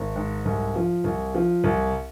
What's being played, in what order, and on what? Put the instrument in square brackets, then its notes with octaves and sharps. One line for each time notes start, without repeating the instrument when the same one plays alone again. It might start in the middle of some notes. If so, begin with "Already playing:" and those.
Already playing: [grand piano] G#1
G#2
C2
F3
C2
F3
C2